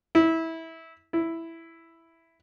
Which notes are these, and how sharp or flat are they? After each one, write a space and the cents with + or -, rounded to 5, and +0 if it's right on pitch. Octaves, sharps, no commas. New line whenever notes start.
E4 -20
E4 +0